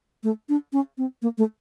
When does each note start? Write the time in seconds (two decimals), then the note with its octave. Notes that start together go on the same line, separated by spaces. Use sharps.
0.23 A3
0.49 D4
0.73 C#4
0.98 C4
1.22 A#3
1.38 A3